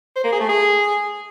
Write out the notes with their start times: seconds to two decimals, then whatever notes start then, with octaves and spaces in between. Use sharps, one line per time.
0.16 C5
0.24 A#3
0.32 G#4
0.41 A3
0.49 G#4